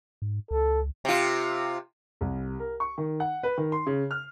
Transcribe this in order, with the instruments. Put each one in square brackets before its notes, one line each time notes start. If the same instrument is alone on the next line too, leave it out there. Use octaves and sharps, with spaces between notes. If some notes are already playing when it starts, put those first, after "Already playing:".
[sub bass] G#2
[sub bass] C#2 [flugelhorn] A4
[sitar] C3 F4
[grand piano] C2
A#4
C#6
D#3
F#5
B4
D#3
C6
C#3
F6